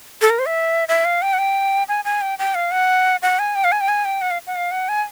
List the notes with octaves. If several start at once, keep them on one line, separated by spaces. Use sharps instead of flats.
A4
A#4
C5
E5
E5
F5
G5
F#5
G5
G#5
G#5
G5
G5
F5
F#5
F#5
G#5
G5
F5
G#5
G5
G#5
G5
F#5
F5
F#5
F5
F#5
G#5